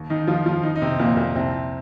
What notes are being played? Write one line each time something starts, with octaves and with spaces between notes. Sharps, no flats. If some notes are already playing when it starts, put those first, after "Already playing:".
Already playing: D#2
D#3 D#4
D#2 F3 F4
F3 F4
D#3 D#4
D#4
C3 C4
C4
F2 A#2 A#3
A#2 A#3
C2 C3 C4